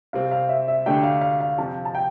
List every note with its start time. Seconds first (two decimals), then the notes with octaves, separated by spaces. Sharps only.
0.13 C2 C3 G3 C4 F5
0.31 F5
0.49 E5
0.68 E5
0.86 D2 D3 A3 D4 G4 G5
1.03 F5
1.21 F5
1.40 F5
1.58 F2 C3 F3 A5
1.85 A5
1.95 G5